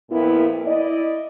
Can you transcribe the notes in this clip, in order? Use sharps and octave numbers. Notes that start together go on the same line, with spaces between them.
F2 A#2 A#3 B3 E4
E4 D5 D#5